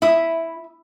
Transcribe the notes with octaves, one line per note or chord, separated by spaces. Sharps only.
E4 E5 B5 D#6